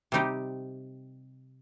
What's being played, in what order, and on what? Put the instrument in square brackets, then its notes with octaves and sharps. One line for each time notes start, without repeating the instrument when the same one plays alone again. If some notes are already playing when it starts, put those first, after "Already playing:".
[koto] C3 G3 D#4 G4